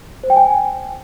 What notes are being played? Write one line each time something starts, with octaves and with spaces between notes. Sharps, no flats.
C5
G5
G#5